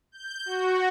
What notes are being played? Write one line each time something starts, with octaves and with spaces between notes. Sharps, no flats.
G6
F#4